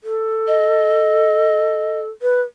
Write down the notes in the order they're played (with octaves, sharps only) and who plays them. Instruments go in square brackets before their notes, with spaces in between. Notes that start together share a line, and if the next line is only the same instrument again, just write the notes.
[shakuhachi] A4
[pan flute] D#5
[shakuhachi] B4